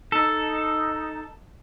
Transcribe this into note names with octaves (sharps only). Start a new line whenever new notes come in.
D#4 A4